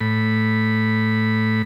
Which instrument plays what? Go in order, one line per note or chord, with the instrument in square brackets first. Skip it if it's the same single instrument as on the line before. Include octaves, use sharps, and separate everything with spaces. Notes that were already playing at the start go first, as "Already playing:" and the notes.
[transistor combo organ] A2 B5